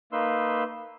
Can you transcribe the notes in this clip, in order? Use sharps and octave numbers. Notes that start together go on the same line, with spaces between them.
A#3 D#4 B4 C6 E6